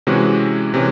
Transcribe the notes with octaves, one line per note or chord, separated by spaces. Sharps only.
C3 E3 G#3 C#4 F#4
C3 E3 G#3 C#4